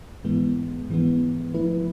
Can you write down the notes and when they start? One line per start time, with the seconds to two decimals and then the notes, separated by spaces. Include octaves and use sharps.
0.24 G#2 E3 G#3 B3
0.89 G#2 E3 G#3 B3
1.54 F3 A3 E4 B4